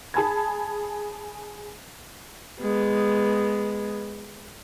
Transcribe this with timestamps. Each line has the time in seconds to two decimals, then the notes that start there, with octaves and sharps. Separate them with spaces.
0.14 G#4 A5 B5 G#6
2.61 G#3 B3